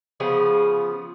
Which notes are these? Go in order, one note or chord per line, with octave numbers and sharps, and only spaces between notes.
C#3 F3 B3 G#4